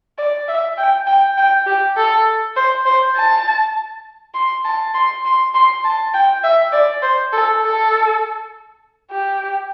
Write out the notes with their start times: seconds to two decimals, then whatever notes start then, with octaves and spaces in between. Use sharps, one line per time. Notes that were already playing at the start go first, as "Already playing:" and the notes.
0.18 D5
0.48 E5
0.78 G5
1.07 G5
1.38 G5
1.66 G4
1.97 A4
2.56 C5
2.86 C5
3.16 A5
4.34 C6
4.65 A5
4.94 C6
5.25 C6
5.54 C6
5.84 A5
6.14 G5
6.44 E5
6.73 D5
7.02 C5
7.33 A4
7.63 A4
9.12 G4